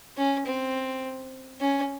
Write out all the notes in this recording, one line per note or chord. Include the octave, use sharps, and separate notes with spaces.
C#4
C4
C#4